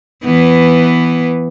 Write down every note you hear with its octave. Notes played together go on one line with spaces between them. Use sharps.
E3 B3